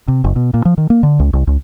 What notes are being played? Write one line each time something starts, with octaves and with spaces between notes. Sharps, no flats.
C3
F#1
B2
A#2
F3
D#3
A#3
D3
C#2
C2
C#2